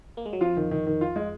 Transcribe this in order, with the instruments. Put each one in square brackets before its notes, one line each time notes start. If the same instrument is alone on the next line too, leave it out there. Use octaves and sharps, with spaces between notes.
[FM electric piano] A#3
G#3
F#3
[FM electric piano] F2 F3 [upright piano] F4
[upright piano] D#3
D#3
D#3
F4
G#3